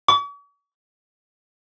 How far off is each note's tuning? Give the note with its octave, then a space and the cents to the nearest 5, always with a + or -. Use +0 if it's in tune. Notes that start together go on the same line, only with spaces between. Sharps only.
C#6 +45